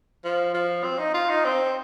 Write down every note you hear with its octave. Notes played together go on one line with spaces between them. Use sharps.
F3
F3
C4
D#4
F4
D#4
C4